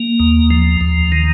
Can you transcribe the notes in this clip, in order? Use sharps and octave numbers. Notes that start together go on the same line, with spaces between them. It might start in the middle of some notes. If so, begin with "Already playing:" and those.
Already playing: A#3
D#2
F3
D#2
D#3